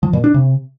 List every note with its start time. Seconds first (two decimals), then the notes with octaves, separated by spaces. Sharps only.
0.03 F3
0.13 A#2
0.24 D4
0.34 C3